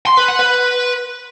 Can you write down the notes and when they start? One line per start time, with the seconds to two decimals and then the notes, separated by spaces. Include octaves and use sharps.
0.07 C6
0.17 B4
0.28 F#5
0.39 B4